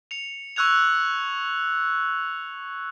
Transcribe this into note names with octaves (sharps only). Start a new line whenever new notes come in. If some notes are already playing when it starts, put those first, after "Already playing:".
C#7 F7
C#6 E6 F#6 G#6 F7